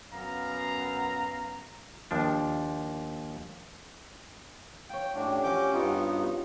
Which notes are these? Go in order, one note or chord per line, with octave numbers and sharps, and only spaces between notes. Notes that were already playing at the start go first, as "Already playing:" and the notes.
F#2 B3 F5 A#5
D#2 F3 D4
F4 C#5 G5
A2 C#4 D4 F#4 G4
F3 C#4 F#4 D6 G6
G2 B3 D#4 F4